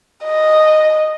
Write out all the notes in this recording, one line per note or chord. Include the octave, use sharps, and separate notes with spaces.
D#5